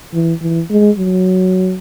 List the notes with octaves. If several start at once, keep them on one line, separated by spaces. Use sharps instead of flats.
E3
E3
G#3
F#3